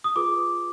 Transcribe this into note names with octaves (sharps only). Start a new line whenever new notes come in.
D#6
F4 G#4 B4 D6